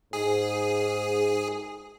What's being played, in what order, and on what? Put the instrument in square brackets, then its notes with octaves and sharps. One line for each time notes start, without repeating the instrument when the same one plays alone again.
[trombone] G#2 [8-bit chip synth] G#4